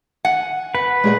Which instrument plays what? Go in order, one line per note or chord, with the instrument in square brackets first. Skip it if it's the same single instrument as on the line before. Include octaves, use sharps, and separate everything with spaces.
[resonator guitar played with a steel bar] F#5 [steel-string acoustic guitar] G#5
[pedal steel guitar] B4 [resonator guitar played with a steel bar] F#5
[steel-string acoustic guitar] A#2 G#4 D#5 [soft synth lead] G#3